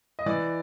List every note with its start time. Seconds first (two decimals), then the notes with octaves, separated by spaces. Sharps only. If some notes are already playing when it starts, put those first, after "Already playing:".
0.19 D#5
0.26 E3 D5